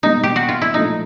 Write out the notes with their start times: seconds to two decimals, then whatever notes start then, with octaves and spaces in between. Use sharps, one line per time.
0.03 B2 G3 A#3 D4 D#4
0.23 G4
0.36 F#4
0.49 F4
0.62 E4
0.74 A#2 F3 A3 D4 D#4